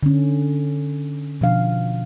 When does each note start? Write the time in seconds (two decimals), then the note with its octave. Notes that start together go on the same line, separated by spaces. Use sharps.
0.03 D3 C#4
1.41 B2 F3 D4 F5